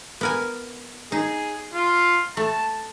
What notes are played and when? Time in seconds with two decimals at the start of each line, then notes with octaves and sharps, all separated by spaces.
0.21 B3 A#4 G#5
1.12 D#4 G#4
1.74 F4
2.37 A3 A5